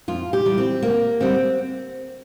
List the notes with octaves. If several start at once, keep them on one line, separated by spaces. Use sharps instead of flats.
F2 F4
G4
E3 G3
C4
D2 A#3
D3 G3 C4